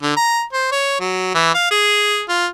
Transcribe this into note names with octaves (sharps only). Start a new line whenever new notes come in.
D3
A#5
C5
C#5
F#3
E3
F5
G#4
F4